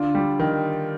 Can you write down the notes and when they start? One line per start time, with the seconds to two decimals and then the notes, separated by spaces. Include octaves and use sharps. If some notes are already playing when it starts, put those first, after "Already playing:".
Already playing: D3 D4 F4
0.15 G3
0.40 D#3